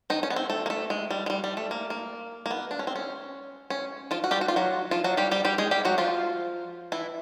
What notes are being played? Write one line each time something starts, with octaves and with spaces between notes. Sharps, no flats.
D#3 D#4
C#4
B3
C4
A3
A#3
A3
G#3
G3
G#3
G3
G3
A3
A#3
A#3
A#3
B3
D4
C#4
C4
C#4
C#4
F3 F4
F#4
G3 G4
F#4
F4
F#3 F#4
F3 F4
F#3 F#4
G3 G4
G3 G4
G3 G4
G#3 G#4
G3 G4
F#3 F#4
F3 F4
E3 E4